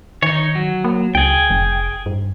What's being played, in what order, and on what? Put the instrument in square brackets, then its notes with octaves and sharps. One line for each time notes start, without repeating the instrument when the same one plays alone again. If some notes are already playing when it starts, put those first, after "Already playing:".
[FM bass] D#3 [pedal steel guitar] D#4 C#5
[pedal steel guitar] F#3
[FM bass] A#3
[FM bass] C#2 [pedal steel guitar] G#4 G5
[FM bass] F1
G2